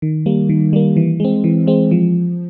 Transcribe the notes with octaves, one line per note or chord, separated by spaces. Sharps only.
D#3
G3 A#3
D#3
G3 A#3
E3
G#3 C4
E3
G#3 C4
F3